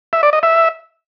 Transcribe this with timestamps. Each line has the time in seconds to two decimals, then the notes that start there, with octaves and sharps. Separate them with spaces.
0.13 E5
0.23 D5
0.33 D#5
0.43 E5